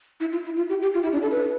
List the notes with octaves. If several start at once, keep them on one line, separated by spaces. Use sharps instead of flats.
E4
F4
E4
F4
G4
G4
F4
E4
D4
A4
B4